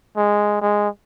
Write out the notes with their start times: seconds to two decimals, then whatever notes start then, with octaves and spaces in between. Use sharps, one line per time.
0.17 G#3
0.62 G#3